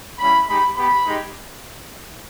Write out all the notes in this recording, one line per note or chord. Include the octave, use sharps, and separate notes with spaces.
G3 C#4 E4 B5
G#3 D#4 G4 B5
B3 G4 B5
G#3 D#4 G4